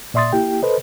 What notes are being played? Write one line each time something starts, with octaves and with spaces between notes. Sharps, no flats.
A#2 D5 E5 C6 D#6 A6
A#3 E4 G4 G5
A4 B4 C5 D#5